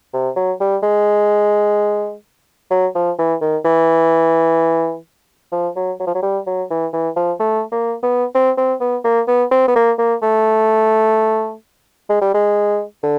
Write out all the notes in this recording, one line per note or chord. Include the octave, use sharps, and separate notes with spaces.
C3
F#3
G3
G#3
F#3
F3
E3
D#3
E3
F3
F#3
F#3
F3
F#3
G3
F#3
E3
E3
F3
A3
A#3
B3
C4
C4
B3
A#3
B3
C4
B3
A#3
A#3
A3
G#3
G3
G#3
D3